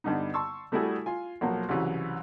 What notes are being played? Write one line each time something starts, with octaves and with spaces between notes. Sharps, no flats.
G2 D3 G3 B3 D#4
A5 C6 C#6 E6
G3 A3 E4 F#4 G#4 A4
F4 G#5
B1 F3 F#3 A#3
C2 C#3 E3 F#3